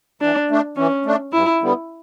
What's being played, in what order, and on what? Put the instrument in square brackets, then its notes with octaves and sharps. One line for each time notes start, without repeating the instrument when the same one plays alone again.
[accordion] E3 [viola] D4
[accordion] A3 D4
[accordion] E3 [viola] C#4
[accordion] A3 D4
[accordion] G2 [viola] E4
[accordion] D3 G3 B3